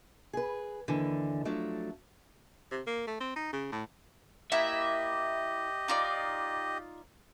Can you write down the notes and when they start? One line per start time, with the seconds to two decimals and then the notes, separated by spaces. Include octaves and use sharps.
0.33 G#4 B4
0.88 D#2 D3 E3
1.45 F3 F#3 A3 D4
2.71 C3
2.87 A#3
3.07 A3
3.20 C4
3.36 D#4
3.53 C#3
3.72 A2
4.52 A#3 E4 G4 D#5 E5
5.88 D#4 F4 D5